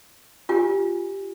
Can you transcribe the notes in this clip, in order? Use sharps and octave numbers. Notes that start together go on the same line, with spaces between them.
F4 G4 G#5